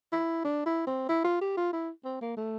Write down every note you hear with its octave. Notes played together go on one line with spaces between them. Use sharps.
E4
D4
E4
C4
E4
F4
G4
F4
E4
C4
A#3
A3